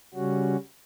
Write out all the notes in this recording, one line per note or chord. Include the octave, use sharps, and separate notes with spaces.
C#3 G3 C#4 F#4